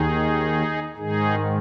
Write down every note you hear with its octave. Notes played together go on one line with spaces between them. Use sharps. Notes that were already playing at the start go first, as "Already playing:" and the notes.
Already playing: D#2 D#3 D#4 G#4
G#2 D#3 D#4 G#4